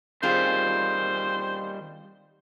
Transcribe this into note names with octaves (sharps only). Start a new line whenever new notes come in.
D#3 G3 C4 F4 G#4 C5